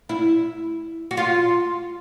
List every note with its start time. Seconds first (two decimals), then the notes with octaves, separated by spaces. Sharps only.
0.09 E4
1.11 F#4
1.17 F4